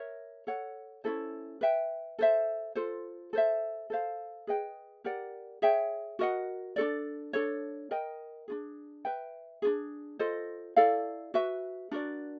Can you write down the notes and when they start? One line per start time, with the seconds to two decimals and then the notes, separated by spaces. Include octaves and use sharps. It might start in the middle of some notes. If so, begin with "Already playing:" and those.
Already playing: A#4 C#5 E5
0.47 A4 C#5 F#5
1.04 C#4 E4 A4 C5
1.61 B4 E5 G5
2.19 A4 C5 E5
2.75 F4 A4 C5
3.33 A4 C5 E5
3.90 A4 C5 F5
4.47 G#4 B4 D#5 G5
5.04 G4 A#4 D5 F#5
5.62 G#4 C#5 E5 G5
6.19 F#4 A#4 D#5 F#5
6.76 D4 F#4 A4 D5
7.33 D4 F4 A4 C#5
7.91 A#4 D#5 G5
8.48 D4 F4 G#4
9.05 B4 E5 G5
9.62 D4 F4 G#4
10.19 F4 A4 C5 D#5
10.76 E4 A4 D5 F5
11.34 F#4 B4 E5
11.91 D4 F#4 A#4 D5